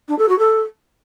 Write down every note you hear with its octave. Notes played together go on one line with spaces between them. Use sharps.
D4
A4
F#4
A4